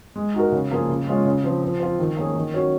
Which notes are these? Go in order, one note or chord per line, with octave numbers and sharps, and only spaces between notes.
G#3
D#4 F#4 A#4
C#3
F3 A#3 F4 G#4
C#3
G#3 C#4 F4
C#3
F3 C4
F3
C4 F4
D#3
A#3 C#4 G#4
D#3
F#3 C#4